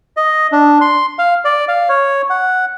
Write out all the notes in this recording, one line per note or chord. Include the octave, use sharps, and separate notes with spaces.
D#5
D4
C6
F5
D5
F5
C#5
F#5